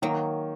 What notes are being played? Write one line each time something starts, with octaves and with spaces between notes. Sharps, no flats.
D#3 F#3 A#3